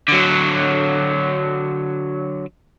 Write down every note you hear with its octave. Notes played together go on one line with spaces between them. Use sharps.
D3 F#3